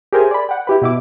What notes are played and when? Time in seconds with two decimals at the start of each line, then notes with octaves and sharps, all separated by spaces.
0.13 G4 G#4 A#4 C5 E5 G#5
0.31 D5 B5
0.49 F#5 G5
0.67 E4 G4 B4
0.82 B2 E4 D6